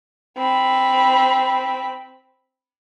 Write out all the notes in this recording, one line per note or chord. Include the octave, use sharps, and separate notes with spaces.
C4 B5